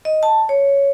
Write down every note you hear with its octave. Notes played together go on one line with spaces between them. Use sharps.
D#5
A5
C#5